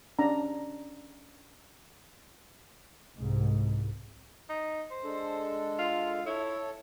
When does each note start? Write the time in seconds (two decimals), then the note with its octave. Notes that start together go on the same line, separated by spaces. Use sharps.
0.19 C#4 D4 A#5
3.16 C2 G#2
4.49 D#4
4.90 C5
5.04 G#3 D4 A4
5.79 F4
6.26 E4 A4 C#5